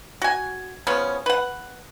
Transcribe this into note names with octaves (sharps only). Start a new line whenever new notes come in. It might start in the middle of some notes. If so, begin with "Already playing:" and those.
F#4 G#5
C#3 F3 B3 C#4
B4 F#5